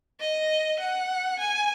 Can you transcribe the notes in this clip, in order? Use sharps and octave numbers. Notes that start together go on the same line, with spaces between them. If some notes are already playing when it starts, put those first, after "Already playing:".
D#5
F#5
G#5